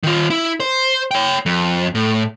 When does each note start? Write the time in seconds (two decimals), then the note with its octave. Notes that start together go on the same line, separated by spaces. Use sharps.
0.03 D#3 F4
0.30 E4
0.60 C5
1.11 C#5 G5
1.46 F2
1.95 A2